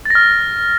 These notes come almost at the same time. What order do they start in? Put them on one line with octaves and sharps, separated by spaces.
A6 A#6 F6